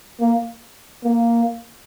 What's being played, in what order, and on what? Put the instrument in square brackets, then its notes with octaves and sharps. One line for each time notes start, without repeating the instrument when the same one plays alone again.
[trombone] A#3
A#3